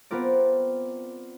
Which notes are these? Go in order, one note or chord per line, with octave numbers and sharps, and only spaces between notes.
B3 C4 F4 A#4 D5